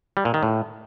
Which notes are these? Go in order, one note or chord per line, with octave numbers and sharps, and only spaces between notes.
G3
A#2
D#3
A2